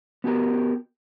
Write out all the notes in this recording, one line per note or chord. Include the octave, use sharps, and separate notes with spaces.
B3 F#4 G4 A#4